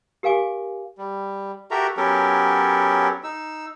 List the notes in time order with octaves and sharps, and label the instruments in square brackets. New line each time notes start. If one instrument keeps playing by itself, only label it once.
[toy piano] G4 A#4 F5 G#5 D6
[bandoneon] G3
F#4 G4 A4 A#4 E5 A#5
F#3 B3 C#4 G4 A4 A#4
D#4 E6